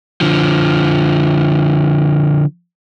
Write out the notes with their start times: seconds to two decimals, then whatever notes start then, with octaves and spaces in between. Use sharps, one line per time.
0.21 D3 F3